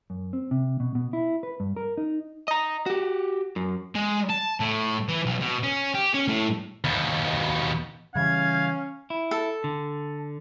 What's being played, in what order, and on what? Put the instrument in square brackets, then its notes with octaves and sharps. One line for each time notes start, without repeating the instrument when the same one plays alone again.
[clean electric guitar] F#2
C4
C3
B2
B2
E4
B4
G2
A#4
D#4
[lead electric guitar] D#5 A#5
F#4 G4
F#2
[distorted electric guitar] G#3
A5
A2
E3
B1
B2
C#4
G4
C#4
A2
D#2 B2
[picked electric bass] C#3 E3 G3 [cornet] C#4 [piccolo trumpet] F5 [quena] G#6
[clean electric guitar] E4
[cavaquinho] A4
[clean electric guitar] D3